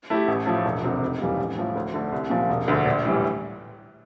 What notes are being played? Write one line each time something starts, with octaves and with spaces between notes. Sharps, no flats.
A3 E4 G4
A1
A2 F3 A3
E1
D2 C3
F1
F2 E3 G3 A#3
A1
A2 F3
D2
D3 A3
C2
A#2 F3
E1
D2 D3
A#1
A2 E3 G3